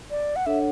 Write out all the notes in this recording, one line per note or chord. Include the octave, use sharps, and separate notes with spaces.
D5
F#5
D4 A4 C#5 E5 F#5